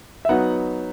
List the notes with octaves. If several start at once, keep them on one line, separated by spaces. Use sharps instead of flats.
E5
F#3 B3 D#4 F#5